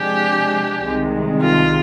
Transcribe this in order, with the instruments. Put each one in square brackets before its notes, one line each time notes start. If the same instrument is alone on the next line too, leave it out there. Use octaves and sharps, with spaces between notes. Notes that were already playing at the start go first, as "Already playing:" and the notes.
Already playing: [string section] C3 F3 G#3 D4 G#4 [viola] G4
[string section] C2 C3 D#3 G#3
[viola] F4